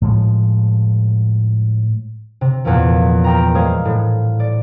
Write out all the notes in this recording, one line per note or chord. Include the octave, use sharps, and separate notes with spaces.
A2 F3 G#3
C3
E2 A#2 F3
A#4 G5 A#5
G3 G#3 G#4 C5 F5
A2
D5